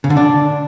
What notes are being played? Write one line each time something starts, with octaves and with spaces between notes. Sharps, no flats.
C#3
D3
D4